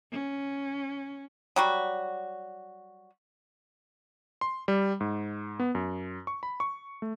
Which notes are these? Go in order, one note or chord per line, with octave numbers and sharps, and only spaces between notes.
C#4
F#3 G3 F#4
C6
G3
G#2
B3
F#2
C#6
B5
C#6
A3